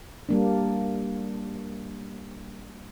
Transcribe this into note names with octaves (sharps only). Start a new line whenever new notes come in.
G3 A#3 D4